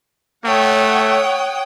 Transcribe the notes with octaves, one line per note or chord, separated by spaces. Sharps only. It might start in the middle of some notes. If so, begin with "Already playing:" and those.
A3 C#5 F#5 G5 D#6